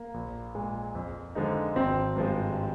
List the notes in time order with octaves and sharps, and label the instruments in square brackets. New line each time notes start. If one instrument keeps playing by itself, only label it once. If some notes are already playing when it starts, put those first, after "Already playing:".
Already playing: [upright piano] A#3
[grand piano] A#1
A#2 G#3
F2
D3 F3 G#3 D#4
[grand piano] G#1 [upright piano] C4
[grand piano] G2 F3 G#3